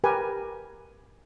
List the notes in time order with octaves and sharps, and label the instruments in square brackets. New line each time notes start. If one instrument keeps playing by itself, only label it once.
[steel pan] G4 A#4 B4 G#5